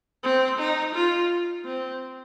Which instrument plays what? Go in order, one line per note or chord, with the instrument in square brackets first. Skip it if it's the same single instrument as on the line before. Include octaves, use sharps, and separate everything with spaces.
[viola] C4
D#4
F4
C4